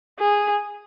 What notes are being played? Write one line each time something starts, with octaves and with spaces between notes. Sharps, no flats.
G#4